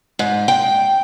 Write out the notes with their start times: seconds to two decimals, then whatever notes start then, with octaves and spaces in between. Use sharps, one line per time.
0.19 G#2
0.48 G5